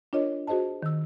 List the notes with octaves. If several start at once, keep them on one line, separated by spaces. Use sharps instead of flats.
D4 F4 A#4 C#5 D#5
F#4 G#4 C5 D#5 A5
D#3 E6